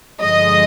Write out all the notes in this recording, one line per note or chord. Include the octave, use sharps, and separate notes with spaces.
G2 D3 F3 G#3 D#5